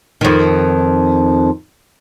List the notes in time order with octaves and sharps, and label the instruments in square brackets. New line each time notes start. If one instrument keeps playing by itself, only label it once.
[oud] F2 D#3